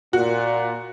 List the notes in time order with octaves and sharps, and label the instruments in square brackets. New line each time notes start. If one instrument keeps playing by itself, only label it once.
[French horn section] A#2 [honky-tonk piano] F#4